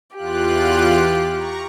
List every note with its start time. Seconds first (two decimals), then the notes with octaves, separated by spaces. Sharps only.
0.15 E2 F4 G4 F#6
1.33 A#5 C#6